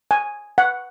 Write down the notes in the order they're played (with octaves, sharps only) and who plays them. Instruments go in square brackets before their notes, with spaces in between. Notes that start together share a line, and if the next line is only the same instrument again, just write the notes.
[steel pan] G#5
F#5